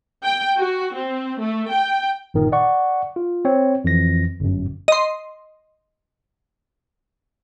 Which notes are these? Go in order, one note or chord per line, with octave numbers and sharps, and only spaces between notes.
G5
F#4
C4
A3
G5
G1 A#2 D#3
D5 F#5 C#6
F4
C4 C#5
F2 E3 A#6
G1 F#2
D#5 C6